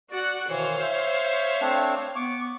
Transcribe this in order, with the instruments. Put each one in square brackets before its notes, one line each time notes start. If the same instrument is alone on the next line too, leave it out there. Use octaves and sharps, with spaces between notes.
[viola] F#4 F#5 [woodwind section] D5
[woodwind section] B2 D#3 [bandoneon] E3 [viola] C5 F5 [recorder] C#5
[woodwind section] E5 [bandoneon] G6
[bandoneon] A3 C4 D4
[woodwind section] B3 [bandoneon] C#6 D6